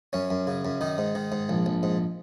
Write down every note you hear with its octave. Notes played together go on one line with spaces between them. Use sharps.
F#2 C#4
F#2
C#3
F#2
D#3 D#4
G#2
D#3
G#2
A#1
A#1
G#2